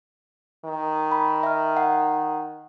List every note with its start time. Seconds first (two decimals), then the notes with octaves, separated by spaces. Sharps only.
0.65 D#3
1.12 B5
1.43 E5 F6
1.77 F#5